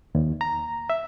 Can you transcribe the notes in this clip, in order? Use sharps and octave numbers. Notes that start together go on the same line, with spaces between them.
D#2
A#5
E5